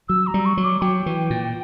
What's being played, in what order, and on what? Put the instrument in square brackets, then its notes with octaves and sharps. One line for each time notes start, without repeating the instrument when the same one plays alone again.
[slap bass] F#3 [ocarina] E6
[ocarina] A#5
[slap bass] G3
[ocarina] C#6
[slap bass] F#3
[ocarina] D6
[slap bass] F#3 [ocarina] G5
[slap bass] E3
A#2